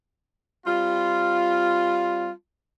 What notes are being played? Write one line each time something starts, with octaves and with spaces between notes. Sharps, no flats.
G3 C4 F4